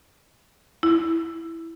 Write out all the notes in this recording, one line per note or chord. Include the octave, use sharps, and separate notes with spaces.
E4